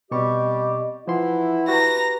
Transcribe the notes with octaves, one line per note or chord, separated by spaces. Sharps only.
B2 G3 C4 G4 D#5 C#6
E3 F3 E4 F#5 C6
F#4 G4 B4 A#5 A#6